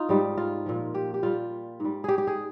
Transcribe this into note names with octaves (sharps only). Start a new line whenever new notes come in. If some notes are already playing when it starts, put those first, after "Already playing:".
Already playing: D#4 F4
G#2 G3
F4
A#2 F3
G4
G4
A#2 G3 F4
G#2 G3
G4 G#4
G4
G#4